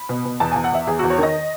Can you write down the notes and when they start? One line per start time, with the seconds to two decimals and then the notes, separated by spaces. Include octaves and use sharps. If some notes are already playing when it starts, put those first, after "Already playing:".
Already playing: B5
0.09 B2
0.25 B2
0.40 E2 A5
0.52 E2 G#5
0.64 F#5
0.72 E2 E5
0.87 E2 G#4
0.99 E2 F#4
1.10 C#5
1.18 D#3 D#5